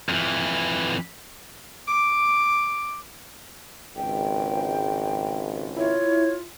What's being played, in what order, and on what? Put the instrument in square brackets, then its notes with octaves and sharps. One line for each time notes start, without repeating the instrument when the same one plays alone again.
[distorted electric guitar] F2 E3
[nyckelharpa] D6
[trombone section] G#1 C#2 [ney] G5
[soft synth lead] E4 [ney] F4 [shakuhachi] C#5